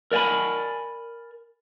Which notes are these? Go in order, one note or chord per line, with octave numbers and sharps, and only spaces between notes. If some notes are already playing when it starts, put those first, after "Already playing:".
A#4 D5 G5 G#5 B5